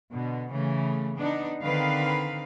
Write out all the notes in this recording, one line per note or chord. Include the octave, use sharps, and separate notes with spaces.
B2 D3
C#3 E3 A3
B3 D4 D#4
D3 D#3 C4 B4 F5